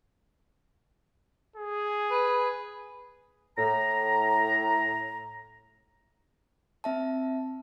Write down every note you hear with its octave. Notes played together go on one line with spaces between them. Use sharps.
G#4
B4
A2 A#5
C4 E5 A5